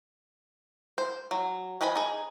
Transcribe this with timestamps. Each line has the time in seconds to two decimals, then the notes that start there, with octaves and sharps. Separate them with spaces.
0.98 C5
1.31 F#3
1.81 F3 B4 D#5 G#5 B5
1.95 D#4 G#4